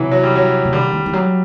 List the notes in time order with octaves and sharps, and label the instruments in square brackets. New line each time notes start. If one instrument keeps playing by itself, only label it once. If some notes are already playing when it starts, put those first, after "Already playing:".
Already playing: [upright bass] C3 [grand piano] E3 F#3
[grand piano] F#3
G3
F#3
[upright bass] C3
[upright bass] D3 [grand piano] G3
[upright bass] E3
E3
F#3